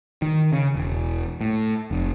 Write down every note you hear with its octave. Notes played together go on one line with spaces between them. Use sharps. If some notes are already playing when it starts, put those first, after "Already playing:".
D#3
C#3
E1
A2
F1